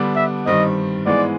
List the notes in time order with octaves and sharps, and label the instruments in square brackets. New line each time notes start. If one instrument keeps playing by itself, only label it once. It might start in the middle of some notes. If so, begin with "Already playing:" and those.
Already playing: [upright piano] D3 G3 B3 D4
[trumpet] E5
[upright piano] G2 D#3 G3 C4 [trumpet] D#5
[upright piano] G#2 E3 G#3 B3 [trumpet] D5